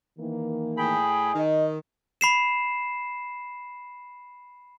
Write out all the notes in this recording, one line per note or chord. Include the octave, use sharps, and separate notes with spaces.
D#3 E3 A#3
A2 G#4 G5 B5
D#3 D#5
B5 C7 E7